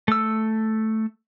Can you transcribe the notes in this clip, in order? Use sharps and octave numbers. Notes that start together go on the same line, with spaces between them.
A3 E6